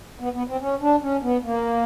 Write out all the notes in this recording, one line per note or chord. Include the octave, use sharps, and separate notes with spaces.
B3
B3
C4
C#4
D4
C#4
B3
A#3